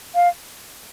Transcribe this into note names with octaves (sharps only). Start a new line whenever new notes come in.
F5